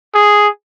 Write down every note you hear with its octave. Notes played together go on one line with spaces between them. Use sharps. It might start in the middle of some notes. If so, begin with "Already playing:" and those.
G#4